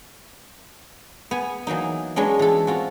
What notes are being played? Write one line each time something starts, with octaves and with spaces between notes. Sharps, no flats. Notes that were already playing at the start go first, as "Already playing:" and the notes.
B3 G#5
E3 F#3 A#3 D#4
F#3 G#3 B3 C#4 D4
E3 A4
C4 F4 F#4